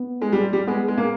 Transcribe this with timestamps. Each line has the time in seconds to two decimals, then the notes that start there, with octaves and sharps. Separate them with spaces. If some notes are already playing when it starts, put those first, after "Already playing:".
Already playing: B3
0.22 G#3
0.32 G3
0.53 G3
0.67 G#3 B3
0.88 G#3
0.98 A#3